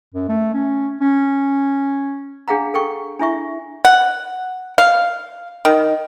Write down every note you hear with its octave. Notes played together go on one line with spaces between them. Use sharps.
F#2
A3
C#4
C#4
D4 G#4 F5 F#5 A#5
A4 G5 C#6
D4 E4 E5 C#6
F#5
F5
D#3